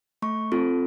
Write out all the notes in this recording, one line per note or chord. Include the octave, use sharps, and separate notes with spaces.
A3 C#6
C4 F4 A4